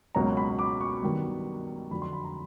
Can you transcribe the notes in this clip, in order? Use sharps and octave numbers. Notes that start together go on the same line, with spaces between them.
C#2 B2 F#3 A#3 C#4 A#5
B5
D6
C#6
G2 D#3 F#3 B3
F2 D3 F#3 B5
C6
B5
A#5